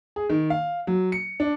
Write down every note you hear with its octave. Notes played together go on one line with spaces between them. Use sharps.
G#4
D#3
F5
F#3
C#7
D4